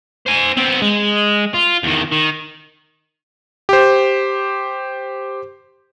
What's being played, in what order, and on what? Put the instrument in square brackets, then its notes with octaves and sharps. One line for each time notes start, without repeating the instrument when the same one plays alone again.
[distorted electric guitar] C5 G#5
B3 C4
G#3
F4
E2 D#3
D#3
[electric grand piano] G4 C5